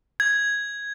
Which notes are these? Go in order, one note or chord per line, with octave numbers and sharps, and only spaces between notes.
G#6